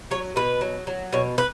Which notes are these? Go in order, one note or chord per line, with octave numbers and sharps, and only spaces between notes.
F#3 C#5
B2 B4
F#3
F#3
B2 C#5
B4